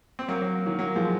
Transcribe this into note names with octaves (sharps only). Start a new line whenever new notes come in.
C4
F#3 A#3
F#3 A#3
D#3 F#3
F#3 A#3
F3 G#3